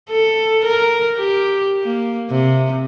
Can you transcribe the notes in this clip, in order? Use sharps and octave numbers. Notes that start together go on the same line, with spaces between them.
A4
A#4
G4
A#3
C3